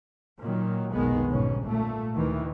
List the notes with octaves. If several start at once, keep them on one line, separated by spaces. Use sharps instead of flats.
A#2 D#3 F#3
F1 B1 D#3 G#3 B3
G1 G#2 B2 C#4
A#2 A3
D2 D#3 E3